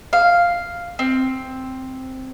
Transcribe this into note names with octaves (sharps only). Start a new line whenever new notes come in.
F5
C4